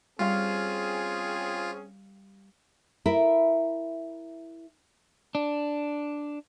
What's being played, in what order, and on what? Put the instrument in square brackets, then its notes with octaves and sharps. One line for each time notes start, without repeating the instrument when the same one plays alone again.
[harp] G3 F5 C6 [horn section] C4 C#4 G#4 [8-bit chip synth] F4
[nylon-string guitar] E4 A#4 E5
[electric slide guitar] D4